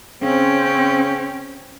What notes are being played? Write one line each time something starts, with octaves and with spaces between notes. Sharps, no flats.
C#3 C4 C#4 G5